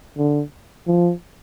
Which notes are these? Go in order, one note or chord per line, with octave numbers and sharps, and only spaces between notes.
D3
F3